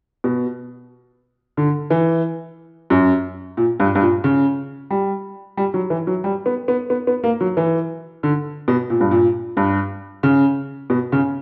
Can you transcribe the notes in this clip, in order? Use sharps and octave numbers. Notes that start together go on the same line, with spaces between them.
B2
D3
E3
F#2
A#2
G2
G2
A#2
C#3
G3
G3
F#3
E3
F#3
G3
B3
B3
B3
B3
A#3
F#3
E3
D3
B2
A#2
G2
A#2
G2
C#3
B2
C#3